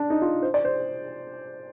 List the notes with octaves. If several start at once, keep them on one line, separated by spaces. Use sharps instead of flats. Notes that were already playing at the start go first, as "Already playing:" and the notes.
Already playing: D4
D#4
F4
C5
D5
C5